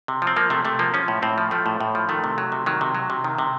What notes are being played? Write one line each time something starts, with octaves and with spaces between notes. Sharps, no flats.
C3
F3
C4
F3 A#3
C3 A3
C3 A3
F3 A#3
F3 C#4
A2
A2 C4
F3
F3 A3
A2
A2
F3
D#3 A3
C3
F#3
C3
D#3 F#3
C3
F#3
C3
D#3
C3